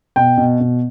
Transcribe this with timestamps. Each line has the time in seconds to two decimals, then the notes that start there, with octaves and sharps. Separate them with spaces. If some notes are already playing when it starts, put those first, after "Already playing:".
0.16 B2 G5
0.38 B2
0.60 B2